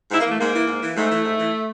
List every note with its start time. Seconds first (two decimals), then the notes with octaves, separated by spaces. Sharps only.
0.11 G#2 E4
0.21 A#3
0.26 E3 A3
0.40 G#2 A#3
0.55 E3
0.68 G#2
0.82 E3
0.97 G#2 A3
1.11 E3
1.25 G#2
1.39 E3